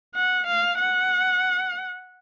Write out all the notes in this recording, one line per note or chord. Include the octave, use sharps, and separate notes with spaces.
F#5
F5
F#5